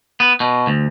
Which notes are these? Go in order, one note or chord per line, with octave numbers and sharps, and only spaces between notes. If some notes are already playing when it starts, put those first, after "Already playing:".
B3
B2
D2